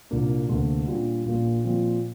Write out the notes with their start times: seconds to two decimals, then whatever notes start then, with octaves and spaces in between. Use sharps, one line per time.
0.10 C2 A#2 A#3 D4
0.49 D2 C3 A#3
0.87 A#2 G3 D4 G4
1.25 A#1 A#2 A#3
1.63 A#2 F3 C4